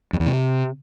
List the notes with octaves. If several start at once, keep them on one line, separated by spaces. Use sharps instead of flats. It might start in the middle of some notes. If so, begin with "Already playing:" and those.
F2
E2
C3